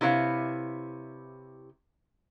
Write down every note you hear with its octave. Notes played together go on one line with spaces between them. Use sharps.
C3 E4 B4 C#5 F5